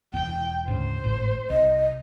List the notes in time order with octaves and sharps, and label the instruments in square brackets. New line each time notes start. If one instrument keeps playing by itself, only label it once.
[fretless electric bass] E1 E2 [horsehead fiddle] G5
[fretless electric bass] D2 G#2 C#3 [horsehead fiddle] C5
[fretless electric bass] G#1 A2
[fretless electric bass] C2 [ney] D#5